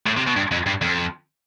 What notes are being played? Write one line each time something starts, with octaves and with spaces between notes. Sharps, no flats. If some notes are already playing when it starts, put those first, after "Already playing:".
A2
C3
B2
G2
F2
G2
F2